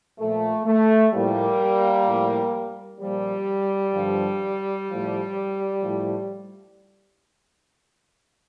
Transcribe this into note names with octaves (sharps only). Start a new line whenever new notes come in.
A#2 F3 A3
A3
A2 F3 G3 A#3
A2 F3
A#2 F3 G3
G2 D3 F3
A2 F3
A2 F3